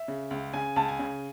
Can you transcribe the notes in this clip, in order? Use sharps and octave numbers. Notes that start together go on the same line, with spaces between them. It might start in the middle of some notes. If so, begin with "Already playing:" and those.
Already playing: E5
C#3
C#2
C#3 G#5
C#2 A5
G#5
C#3